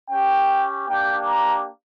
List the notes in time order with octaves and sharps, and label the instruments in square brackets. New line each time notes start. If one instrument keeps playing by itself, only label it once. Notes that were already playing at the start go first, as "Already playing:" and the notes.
[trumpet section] C#4 G4 G5
A#3 D4 G4 G5
A#5